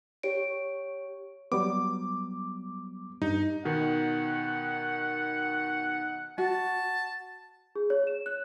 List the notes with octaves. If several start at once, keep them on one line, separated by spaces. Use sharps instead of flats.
G4 C#5 D7
F#3 G3 B3 D6
G2 D#4
B2 D#3 F#5
F#4 A5
G#4
C#5
E7
F#6